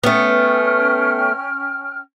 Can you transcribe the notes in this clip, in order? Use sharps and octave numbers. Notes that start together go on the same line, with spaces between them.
A3 B3 C#4 G5 F6